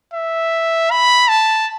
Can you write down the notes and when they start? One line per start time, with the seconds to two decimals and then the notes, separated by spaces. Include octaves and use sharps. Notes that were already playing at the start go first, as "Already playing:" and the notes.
0.14 E5
0.91 B5
1.28 A5